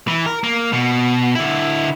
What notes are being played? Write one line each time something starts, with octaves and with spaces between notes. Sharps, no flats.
E3
A#4
A#3
B2
D3 E4